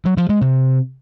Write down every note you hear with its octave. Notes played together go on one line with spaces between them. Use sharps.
F#3
F3
G#3
C3